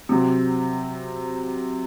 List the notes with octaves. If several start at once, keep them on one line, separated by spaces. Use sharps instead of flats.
C3 F#3 C4